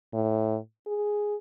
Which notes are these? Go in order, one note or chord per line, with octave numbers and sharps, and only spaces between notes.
A2
G#4